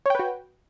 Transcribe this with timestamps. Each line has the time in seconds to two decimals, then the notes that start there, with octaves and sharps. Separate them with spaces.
0.06 C#5
0.10 G5
0.15 B4
0.19 F#4